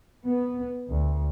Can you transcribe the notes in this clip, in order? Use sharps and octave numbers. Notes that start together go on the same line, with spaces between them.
B3
D2